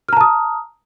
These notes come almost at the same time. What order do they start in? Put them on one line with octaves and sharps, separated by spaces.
F6 A#5 A5 D#6